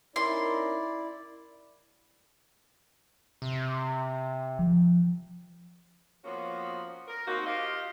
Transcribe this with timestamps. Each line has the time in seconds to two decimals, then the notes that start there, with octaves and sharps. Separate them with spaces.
0.16 C#4 D#4 E4 A#4 D5 C6
3.42 C3
4.59 F3
6.24 F3 A#3 B3 C#4 F#4
7.08 A#4
7.26 A#3 C4 D#4 F#4
7.46 F4 G4 D#5 F5